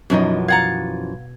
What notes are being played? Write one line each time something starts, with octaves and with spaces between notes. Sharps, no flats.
F#2 B2 E3 F3 C#4 D#4 D#5
F5 F#5 A#5 G#6 A6 C#7